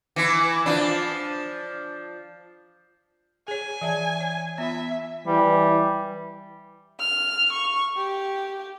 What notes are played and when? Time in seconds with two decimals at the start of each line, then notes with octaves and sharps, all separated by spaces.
0.16 E3 E4
0.66 F3 D4
3.48 G#4 C#5 G#5
3.81 E3 E5 A5
4.21 C#5
4.58 B3 F4 E5 B5
5.27 E3 G3
7.00 F6
7.53 C#6
7.97 G4